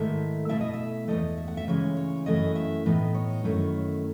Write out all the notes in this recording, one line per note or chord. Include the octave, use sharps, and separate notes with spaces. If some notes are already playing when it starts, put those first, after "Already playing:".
Already playing: G#2 D#3 A3 E4 E5
B2 A3 E4 E5
D#5
E5
E2 D#3 A3 D#5
E5
F#5
E5
C#3 E3 G#3 C#5
C#5
F#2 E3 A3 E4 D#5
E5
A2 E3 B3 D#4
C#5
F#2 D#3 A3 E4